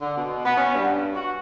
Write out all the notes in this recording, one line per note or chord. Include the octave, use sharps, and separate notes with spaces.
D3
B2
B3
C#4
G2
F#4